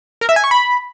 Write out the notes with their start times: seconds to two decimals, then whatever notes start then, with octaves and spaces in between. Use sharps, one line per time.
0.21 A#4
0.29 E5
0.36 G#5
0.44 C#6
0.51 B5